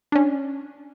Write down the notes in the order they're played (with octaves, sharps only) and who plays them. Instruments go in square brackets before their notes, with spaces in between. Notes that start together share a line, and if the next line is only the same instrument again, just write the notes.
[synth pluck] C#4 D4